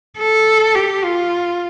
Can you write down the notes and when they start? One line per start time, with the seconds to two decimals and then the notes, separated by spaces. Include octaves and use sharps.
0.19 A4
0.75 G4
1.04 F4